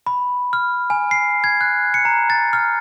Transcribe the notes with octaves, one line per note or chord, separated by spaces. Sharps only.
B5
F6
G#5
C7
G#6
F#6
C#7
A#5
A6
F6